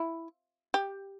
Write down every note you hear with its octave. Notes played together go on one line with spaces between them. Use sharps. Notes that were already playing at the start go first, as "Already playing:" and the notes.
Already playing: E4
G4